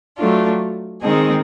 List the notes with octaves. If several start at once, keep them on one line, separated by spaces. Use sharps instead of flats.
F#3 A3 D4 F4
D#3 G#3 C4 D#4 G#4